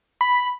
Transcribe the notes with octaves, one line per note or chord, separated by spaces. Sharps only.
B5